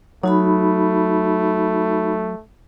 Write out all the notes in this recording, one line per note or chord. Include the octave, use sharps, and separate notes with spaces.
F#3 A3 D#4 F#4 B5